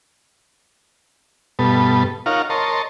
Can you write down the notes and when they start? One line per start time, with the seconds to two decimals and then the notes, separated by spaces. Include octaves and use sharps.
1.59 G2 B2 B3 A4
2.26 D#4 F4 A#4 C#5 F5 F#5
2.50 A#4 C#5 D#5 A5 C6